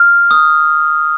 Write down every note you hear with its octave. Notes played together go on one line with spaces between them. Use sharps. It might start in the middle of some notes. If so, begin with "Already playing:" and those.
Already playing: F6
D#6